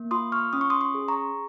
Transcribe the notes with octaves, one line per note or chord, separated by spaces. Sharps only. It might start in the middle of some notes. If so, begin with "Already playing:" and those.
Already playing: A#3
F4 C6 D#6
C#6 F6
C#4 D#6
C#6
C6 D#6
C6 D#6
G#4
A#5 C#6